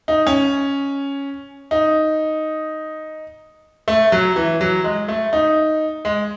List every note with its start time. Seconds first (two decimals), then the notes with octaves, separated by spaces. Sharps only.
0.08 D#4
0.27 C#4
1.71 D#4
3.88 A3
4.12 F#3
4.36 E3
4.61 F#3
4.84 G#3
5.08 A3
5.33 D#4
6.05 G#3